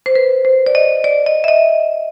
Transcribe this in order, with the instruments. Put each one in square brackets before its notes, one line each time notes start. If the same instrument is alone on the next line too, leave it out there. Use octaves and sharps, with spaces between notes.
[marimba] C5
B4
C5
D5
D#5
D5
D#5
E5
D#5